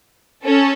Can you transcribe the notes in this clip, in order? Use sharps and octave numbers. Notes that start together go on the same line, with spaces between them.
C#4 A4